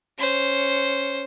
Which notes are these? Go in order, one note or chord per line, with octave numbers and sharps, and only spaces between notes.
C#4 C5